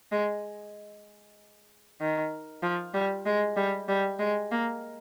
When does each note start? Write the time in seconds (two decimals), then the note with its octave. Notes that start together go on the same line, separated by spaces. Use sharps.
0.12 G#3
2.00 D#3
2.62 F3
2.94 G3
3.26 G#3
3.56 G3
3.88 G3
4.19 G#3
4.51 A#3